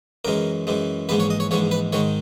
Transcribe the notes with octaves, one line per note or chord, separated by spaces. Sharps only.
F#2 E3 G#3 A#4
F#2 E3 G#3
A#1 G#2 E3 G#3 B4
C#5
D#5
C#5
A#1 G#2 E3 G#3 C#5
B4
G#2 D#3 G#3 C#5